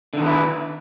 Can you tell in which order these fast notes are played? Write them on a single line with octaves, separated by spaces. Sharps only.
D3 D#3 B3 E4